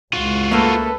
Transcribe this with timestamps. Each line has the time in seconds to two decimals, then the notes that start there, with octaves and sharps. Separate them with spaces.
0.13 C#2 F4 F#4
0.52 A3 A#3 A4 B4